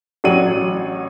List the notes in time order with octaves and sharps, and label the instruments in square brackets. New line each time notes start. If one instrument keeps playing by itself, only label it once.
[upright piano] A1 F#3 D4 C#5 D#7 F#7